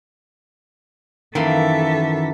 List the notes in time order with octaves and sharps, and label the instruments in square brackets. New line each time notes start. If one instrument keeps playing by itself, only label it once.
[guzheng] F#2 A#3 C6 [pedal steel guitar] D#3 E3 [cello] A4 E5